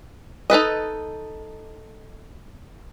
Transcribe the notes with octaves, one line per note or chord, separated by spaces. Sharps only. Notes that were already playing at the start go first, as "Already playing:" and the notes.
D#4 A4 B4 D#5